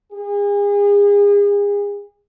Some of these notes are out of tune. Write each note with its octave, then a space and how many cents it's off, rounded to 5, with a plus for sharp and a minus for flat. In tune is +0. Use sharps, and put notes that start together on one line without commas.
G#4 -35